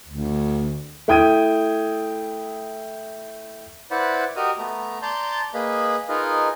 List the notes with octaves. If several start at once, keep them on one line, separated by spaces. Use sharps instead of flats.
D2
A3 E4 G5 D#6 G#6 D#7
E4 B4 C5 D5 F#5 B5
F#4 G4 A#4 D#5 A#5 D#6
A3 B3 A#5
D5 A5 A#5 C6 G6
A#3 G#4 B4 D#5 B5
D#4 F4 G#4 A#4 B4 D#5